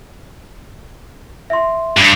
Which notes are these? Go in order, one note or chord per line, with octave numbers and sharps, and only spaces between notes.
E5 C6
G2 G#6 C7 D7